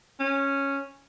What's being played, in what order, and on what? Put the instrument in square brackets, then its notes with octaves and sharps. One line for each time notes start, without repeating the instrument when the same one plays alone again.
[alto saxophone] C#4